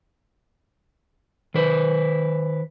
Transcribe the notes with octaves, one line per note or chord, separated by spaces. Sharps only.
D#3 B4 C5